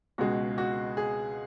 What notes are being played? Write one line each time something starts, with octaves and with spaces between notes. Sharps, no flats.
C#2 B2 G#3 F#4
F#4
G#4